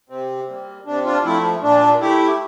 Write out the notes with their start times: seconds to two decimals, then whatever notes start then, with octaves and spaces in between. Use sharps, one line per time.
0.10 C3 C4
0.48 G3 A#3
0.86 C3 D4
1.05 D4 F4
1.24 F3 A3 C4 E4
1.63 A#2 D4
2.01 A3 E4 G4